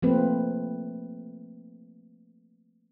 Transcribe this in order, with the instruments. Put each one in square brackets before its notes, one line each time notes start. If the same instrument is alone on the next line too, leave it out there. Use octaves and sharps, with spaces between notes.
[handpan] F3 A3 A#3 C4 B4